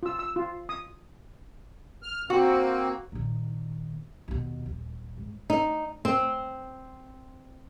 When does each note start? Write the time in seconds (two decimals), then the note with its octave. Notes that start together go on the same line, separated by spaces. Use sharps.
0.03 F4 E6
0.19 E6
0.36 F4
0.69 D#6
2.03 F6
2.30 A#3 C4 F#4
3.12 A#2 D#3
4.28 D#2 B2
4.66 D#1
5.17 G#2
5.50 D#4
6.05 C4